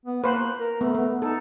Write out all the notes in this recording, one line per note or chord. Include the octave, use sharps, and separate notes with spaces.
B3
A#3 B4 C5
A#4
A3 B3
B3
D#4 A4